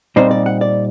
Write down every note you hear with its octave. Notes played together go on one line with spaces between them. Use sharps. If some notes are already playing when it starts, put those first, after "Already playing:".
A#2 G3 C4 D#4 C5
D5
F#5
D5